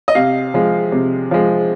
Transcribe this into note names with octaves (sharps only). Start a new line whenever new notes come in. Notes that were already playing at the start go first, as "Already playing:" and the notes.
D#5
C3 F5
F3 G#3
C3
F3 G#3